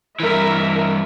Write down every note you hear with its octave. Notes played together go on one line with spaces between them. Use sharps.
G2 E3 A#4 E5